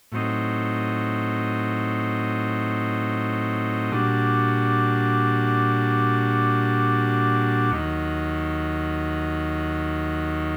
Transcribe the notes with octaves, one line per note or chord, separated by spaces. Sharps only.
A2 F#3 C4 D#4
A#2 G3 D4 F#4
D#2 D#3 F#3